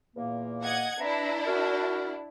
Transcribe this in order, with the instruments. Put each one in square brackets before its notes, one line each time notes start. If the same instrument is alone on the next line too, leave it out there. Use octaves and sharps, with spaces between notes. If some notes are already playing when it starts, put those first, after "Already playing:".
[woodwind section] E2 A#2 A#3
[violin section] D#5 F#5 G#6
[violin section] D4 E4 [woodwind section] B4 E5 A#5
[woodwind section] F#4 A#4